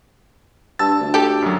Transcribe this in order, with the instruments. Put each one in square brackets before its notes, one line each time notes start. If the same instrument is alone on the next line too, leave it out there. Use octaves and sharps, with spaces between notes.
[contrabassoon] G2 [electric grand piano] A5 E6 A6
[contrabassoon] D2
[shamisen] G4 A4
[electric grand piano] F#2 F#3